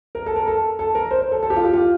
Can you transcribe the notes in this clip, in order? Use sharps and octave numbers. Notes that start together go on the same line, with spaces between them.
A#4
A4
A#4
A4
A4
A#4
C5
C5
A4
A4
G4
F4
G4
F4